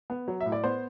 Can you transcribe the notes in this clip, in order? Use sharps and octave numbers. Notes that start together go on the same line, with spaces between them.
B3
F#3
E5
A2
D5
B3 C5